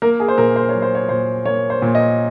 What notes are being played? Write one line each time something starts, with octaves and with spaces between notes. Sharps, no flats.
A#3 A#4
G#4
C5
A#2 A#4
C5
C#5
F#3
C5
C#5
A#2 C5
A#3 C#5
C5
A#2
D#5